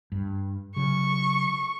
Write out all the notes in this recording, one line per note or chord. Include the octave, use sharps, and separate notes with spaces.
G2
C#3 F#3 C#6